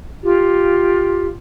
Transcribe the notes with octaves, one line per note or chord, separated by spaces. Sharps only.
F4 G4